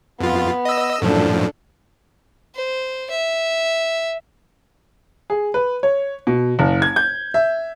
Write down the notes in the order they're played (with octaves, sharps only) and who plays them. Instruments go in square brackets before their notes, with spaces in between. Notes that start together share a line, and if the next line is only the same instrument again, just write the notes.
[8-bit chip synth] F2 F4 [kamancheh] B3
[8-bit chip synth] D#5 E6
[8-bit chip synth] F#2 A2 F3 [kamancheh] D4 A4
[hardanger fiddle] C5
E5
[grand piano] G#4
B4
C#5
B2
F#1
G#6
G6
E5